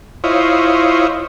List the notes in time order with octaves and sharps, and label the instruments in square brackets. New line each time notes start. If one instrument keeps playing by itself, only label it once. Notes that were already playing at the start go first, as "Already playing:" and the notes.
[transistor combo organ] E4 F4 C5 C#5 D#5